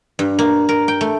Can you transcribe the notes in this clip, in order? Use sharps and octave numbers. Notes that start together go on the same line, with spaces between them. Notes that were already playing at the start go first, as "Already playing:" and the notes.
G2
A#3
A#4
G5
A3